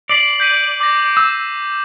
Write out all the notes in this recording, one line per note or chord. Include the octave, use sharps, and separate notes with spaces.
D5 B6 C7 F#7
G6 B6 D#7
D6 A#6
E6